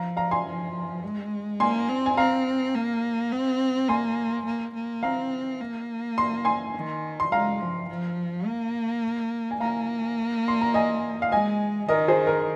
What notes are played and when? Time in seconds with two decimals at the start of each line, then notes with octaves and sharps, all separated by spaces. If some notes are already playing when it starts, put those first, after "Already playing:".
Already playing: F3 F5 A#5
0.17 F5 A#5
0.31 G#5 C6
0.46 F3
1.03 G#3
1.60 A#3 G#5 C6
1.89 C4
2.06 G#5
2.17 C4 F5 A#5
2.75 A#3
3.32 C4
3.88 A#3 G#5 C6
4.46 A#3
4.75 A#3
5.03 C4 F5 A#5
5.60 A#3
6.18 C6
6.45 G#5 C6
6.75 D#3
7.20 C6
7.31 G#3 F5 A#5
7.60 F3
7.89 F3
8.46 A#3
9.51 G#5
9.60 A#3 F5 A#5
10.48 C6
10.61 A#5
10.74 D#5 G#5
11.22 F5
11.32 G#3 D#5 G#5
11.89 D#3 A#4 D#5
12.08 G#4 C5
12.27 A#4